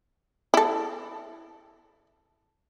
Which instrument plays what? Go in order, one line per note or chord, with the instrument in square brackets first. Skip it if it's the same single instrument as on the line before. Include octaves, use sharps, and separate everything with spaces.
[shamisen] E4 A4